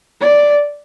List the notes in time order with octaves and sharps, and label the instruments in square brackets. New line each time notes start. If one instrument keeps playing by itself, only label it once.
[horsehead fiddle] D5